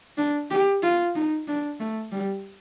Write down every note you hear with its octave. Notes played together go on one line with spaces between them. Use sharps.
D4
G4
F4
D#4
D4
A3
G3